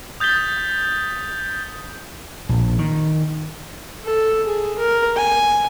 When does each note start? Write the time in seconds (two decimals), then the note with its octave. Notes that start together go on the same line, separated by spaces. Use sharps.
0.20 D#6 G6 A6 B6 G7
2.49 A#1
2.79 D#3
4.04 A4
4.47 G#4
4.79 A#4
5.16 G#5